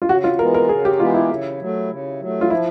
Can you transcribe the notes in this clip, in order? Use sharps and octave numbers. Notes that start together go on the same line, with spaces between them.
F4
C#3 F#4
F4
E3 G#3 B3 A#4
A#4
C#3 G#4
G4
E3 G#3 B3 F4
E4
C#3
F#3 A3
C#3
F#3 A3
F4
F3 E4